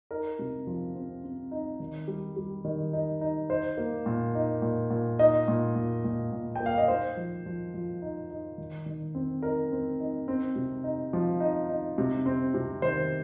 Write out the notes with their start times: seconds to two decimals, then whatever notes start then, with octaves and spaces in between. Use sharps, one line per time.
0.11 D#4 A#4
0.39 C3
0.67 F3
0.95 C4
1.24 C4
1.51 D#4
1.80 D#3
2.08 G3
2.36 G3
2.64 D#3
2.93 D#4
3.21 D#4
3.50 D#4 C5
3.77 A#3
4.06 A#2
4.35 D#4
4.62 A#2
4.90 A#2
5.19 D#4 D#5
5.48 A#2
5.75 A#2
6.04 A#2
6.32 A#2
6.55 G5
6.61 A#3
6.66 F5
6.78 D#5
6.88 D#4 C5
7.17 F3
7.46 F3
7.74 F3
8.02 D#4
8.31 D#4
8.58 D#3
8.86 D#3
9.15 C4
9.42 D#4 A#4
9.72 C4
10.00 D#4
10.28 C4
10.56 C3
10.84 D#4
11.13 F3
11.40 D#4
11.69 D#4
11.98 C3
12.26 C4
12.54 C3
12.82 D#3 C5